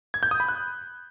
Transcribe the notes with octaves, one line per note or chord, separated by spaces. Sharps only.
G#6
G6
D#6
B5
F#6